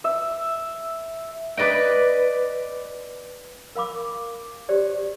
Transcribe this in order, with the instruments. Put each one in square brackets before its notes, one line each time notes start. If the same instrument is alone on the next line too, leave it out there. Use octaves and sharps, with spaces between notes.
[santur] E5
[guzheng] B4 D5 D#5 G5
[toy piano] A#4 F5 B5 D6
F#4 G4 C5 D5